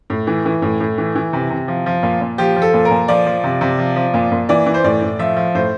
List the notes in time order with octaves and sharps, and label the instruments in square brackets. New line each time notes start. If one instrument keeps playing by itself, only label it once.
[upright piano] A2
E3
E3
A2
A2
E3
E3
C3
C3
F3
F3
A#2
A#2
F3 G4
F3
A4
A#2
A#4
A#2
F3 D5
F3
C3
C3
F3
F3
A#2
A#2
E3 D5
E3
C5
A2 D5
A2
F3 E5
F3
A2 C5